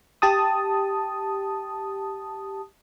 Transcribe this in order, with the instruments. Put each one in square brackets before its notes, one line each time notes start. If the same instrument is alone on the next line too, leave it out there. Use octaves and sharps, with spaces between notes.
[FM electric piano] G4 A5 D#6